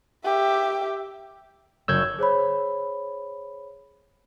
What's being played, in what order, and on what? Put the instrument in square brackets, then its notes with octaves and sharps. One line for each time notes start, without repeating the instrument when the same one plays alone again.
[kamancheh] G4 E5
[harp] F#1 C#5 [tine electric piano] E6 G6 G#6
[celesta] G#4 C5 C#5 B5